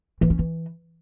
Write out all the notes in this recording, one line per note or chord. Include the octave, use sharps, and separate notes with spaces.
E3
C#4
E3